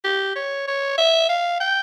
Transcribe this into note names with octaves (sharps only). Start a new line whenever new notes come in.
G4
C#5
C#5
E5
F5
G5